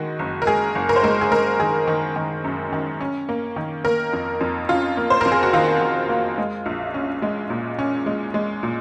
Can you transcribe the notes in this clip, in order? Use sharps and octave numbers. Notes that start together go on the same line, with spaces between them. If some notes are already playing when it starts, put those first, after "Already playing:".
Already playing: D#3 G#3 F#4
F#1
A#4
G#3 G#4
F#1
A#4
C5
G#3 A#4
G#4
G#3 A#4
D#3 G#4
D#3
D#3
F#2
D#3
C#4
A#3
D#3
A#3 A#4
F2
F2
C#4 F4
A#3
C5
F2 A#4
G#4
F#4
D#3 F4
D#3
A#3
G#3
A#1
C#4
G#3
A#2
C#4
G#3
G#3
A#2